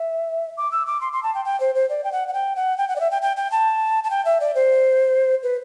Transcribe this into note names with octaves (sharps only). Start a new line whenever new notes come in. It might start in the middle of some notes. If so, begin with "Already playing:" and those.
Already playing: E5
D6
E6
D6
C6
C6
A5
G5
G5
C5
C5
D5
G5
F#5
F#5
G5
F#5
G5
F#5
D5
E5
G5
G5
G5
A5
A5
G5
E5
D5
C5
B4